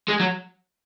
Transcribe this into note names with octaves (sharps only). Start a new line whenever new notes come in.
G#3
F#3